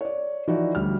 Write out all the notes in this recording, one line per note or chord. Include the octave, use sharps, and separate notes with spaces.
C#5 D5
E3 F3 D#4 F#4 D5
D2 G3 F6